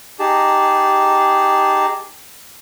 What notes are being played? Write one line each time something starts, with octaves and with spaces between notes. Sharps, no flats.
D#4 G4 G#4 A5